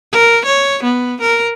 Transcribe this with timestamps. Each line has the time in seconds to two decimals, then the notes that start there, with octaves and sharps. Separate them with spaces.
0.12 A#4
0.45 C#5
0.84 B3
1.21 A#4